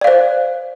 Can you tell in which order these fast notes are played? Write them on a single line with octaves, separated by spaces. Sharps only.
D5 F5 C5